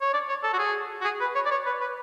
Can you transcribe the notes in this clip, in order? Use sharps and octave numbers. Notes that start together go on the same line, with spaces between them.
C#5
D5
C#5
A4
F#4
G#4
F#4
G#4
B4
C#5
D5
C#5
B4
B4